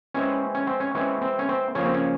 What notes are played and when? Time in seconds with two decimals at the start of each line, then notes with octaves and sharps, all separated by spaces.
0.14 E3 G#3 C4 C#4
0.54 C#4
0.67 C4
0.80 C#4
0.95 E3 G#3 C4 C#4
1.22 C4
1.39 C#4
1.49 C4
1.75 C#3 F3 A#3 C#4
1.85 C4
1.94 C#4